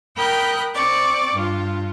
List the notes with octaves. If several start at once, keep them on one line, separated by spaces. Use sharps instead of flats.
A#4 G5 B5 D#6 F#6 G6
C4 D5 C#6 D6
G2 F4